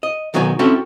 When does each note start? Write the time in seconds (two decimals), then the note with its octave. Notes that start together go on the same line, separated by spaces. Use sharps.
0.03 D#5
0.34 B1 D#3 F#3 B3 D5 G#5
0.59 C4 C#4 E4 F#4 A4 E5